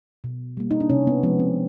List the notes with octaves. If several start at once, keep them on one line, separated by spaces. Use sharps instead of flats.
B2
G3 A#3
D#4
D4
C3 C#4
B3
F3 G#3 B3
C4